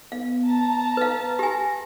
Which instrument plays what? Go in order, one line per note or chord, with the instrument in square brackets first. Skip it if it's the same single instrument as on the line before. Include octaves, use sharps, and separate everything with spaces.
[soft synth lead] B3 [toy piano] F5
[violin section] A5 A#5
[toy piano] B4 F5
[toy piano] G4 G#5 [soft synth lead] A#6